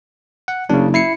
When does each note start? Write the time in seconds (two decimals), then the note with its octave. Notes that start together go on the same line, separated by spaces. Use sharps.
0.48 F#5
0.69 F#1 C#3 D4
0.94 E4 C7 C#7